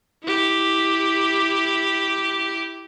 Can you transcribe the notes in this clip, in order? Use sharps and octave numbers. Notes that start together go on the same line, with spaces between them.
E4 G4